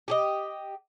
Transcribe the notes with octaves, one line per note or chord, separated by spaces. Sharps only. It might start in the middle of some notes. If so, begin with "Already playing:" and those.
G4 G#4 D#5